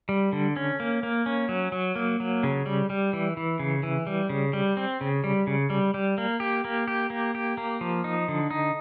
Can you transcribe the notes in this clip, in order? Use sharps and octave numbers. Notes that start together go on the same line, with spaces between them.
G3
D3
C#4
A#3
A#3
C#4
F#3
F#3
A#3
F#3
C#3
G3
G3
E3
E3
C#3
E3
G3
C#3
G3
C4
C#3
G3
C#3
G3
G3
A#3
G4
A#3
G4
A#3
G4
A#3
F3
D#4
D3
D#4